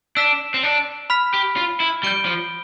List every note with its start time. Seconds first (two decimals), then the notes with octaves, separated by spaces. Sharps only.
0.17 D4 E6 B6 E7
0.54 C4
0.63 D4
1.10 B5 F6 B6
1.34 G4
1.56 F4
1.80 E4
2.03 G3 G6 D7 G7
2.26 F3